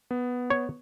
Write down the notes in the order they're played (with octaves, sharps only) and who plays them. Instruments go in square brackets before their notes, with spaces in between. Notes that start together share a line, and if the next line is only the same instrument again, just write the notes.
[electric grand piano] B3
[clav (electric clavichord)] C#5